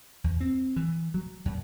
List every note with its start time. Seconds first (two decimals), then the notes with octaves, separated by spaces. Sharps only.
0.24 E2
0.40 C4
0.76 E3
1.14 F#3
1.45 F#2